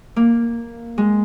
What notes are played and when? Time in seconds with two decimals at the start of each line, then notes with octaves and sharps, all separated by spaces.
0.16 A#3
0.98 G#3